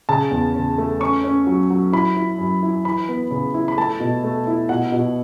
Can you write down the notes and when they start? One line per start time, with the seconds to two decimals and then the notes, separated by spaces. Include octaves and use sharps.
0.09 C#3 A5
0.31 E2
0.55 C#3
0.78 A3
1.00 C#4 C#6
1.24 C#4
1.47 F#3
1.70 F#3
1.92 E4 B5
2.16 E4
2.38 F#2
2.63 E4
2.85 E3 B5
3.09 B3
3.31 C#3
3.54 E4
3.68 B5
3.77 A3 A5
4.00 B2
4.24 A3
4.47 E4
4.69 B2 F#5
4.92 B2